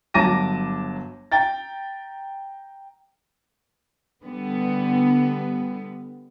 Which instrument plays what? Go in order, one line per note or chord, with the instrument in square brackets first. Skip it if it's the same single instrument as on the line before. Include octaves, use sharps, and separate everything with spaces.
[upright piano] G1 F#3 A5 D6 A#6 D#7
G5 A#5 A6
[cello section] D3 G3 B3